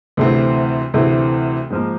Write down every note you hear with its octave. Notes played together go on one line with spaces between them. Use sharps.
D2 C3 E3 A3 C4
D2 C3 E3 A3 C4
G#2 F3 A#3